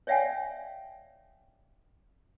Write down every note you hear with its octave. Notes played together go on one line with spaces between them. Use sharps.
C#5 D5 E5 F5 G5 G#5